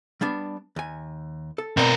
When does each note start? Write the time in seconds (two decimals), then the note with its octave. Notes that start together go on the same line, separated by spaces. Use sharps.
0.21 G3 B3 D4
0.76 D#2 G#5
1.58 A4
1.77 B2 C4 A#4 D5 A#5